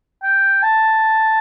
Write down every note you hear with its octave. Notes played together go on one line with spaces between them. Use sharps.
G5
A5